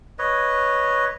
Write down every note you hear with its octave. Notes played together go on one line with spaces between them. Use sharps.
B4 C#5 D#5